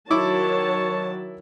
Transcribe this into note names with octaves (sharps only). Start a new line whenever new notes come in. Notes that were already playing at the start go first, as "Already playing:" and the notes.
D#3 F#3 E4 C#5 A5 D6